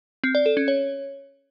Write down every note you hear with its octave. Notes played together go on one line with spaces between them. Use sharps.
C4
D5
A4
C#4
C#5